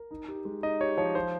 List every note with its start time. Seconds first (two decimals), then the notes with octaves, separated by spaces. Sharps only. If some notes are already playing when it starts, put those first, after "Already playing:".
Already playing: A#4
0.11 D#4
0.29 G4
0.45 G#3
0.63 D#4 D#5
0.80 G4 C#5
0.97 F3 C#5
1.15 F3 C5